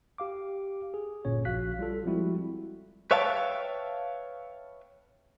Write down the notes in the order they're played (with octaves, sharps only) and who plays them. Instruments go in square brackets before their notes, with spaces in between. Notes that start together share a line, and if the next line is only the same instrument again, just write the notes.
[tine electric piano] G4 F5 D6
G#4
G1 A#2 C#4 C#5
A#1 F#4 F5 F#6 B6
G3 F4 A4
F3 G3 G#3 C4 E4 F#4
[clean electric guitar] B4 C#5 E5 F5 G5 A5